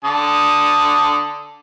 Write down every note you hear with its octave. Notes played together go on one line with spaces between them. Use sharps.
D3 A5 D#6